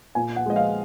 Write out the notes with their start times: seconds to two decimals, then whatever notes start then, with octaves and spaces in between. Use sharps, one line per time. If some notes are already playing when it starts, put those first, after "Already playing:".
0.15 A#2 G#5
0.36 F#5
0.46 F3 G#3 D#5
0.56 F5